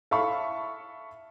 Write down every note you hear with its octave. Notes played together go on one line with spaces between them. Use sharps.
A4 E5 F5 B5 C#6